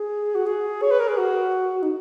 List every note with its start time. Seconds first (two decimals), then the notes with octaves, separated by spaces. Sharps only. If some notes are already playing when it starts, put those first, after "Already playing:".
Already playing: G#4
0.35 F#4
0.46 G#4
0.82 C#5
0.91 B4
1.00 A#4
1.08 G#4
1.18 F#4
1.82 D#4